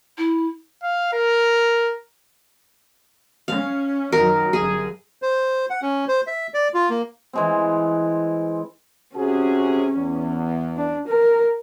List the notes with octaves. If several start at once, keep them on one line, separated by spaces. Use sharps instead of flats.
E4
F5
A#4
C#4 F5
F#2 D#3 F#3 A#4
G1 F#2 G#4
C5
F#5
C#4
C5
E5
D5
F4
A#3
E3 G#3 C4
C3 C#4 F#4 G#4
E2
D4
A#4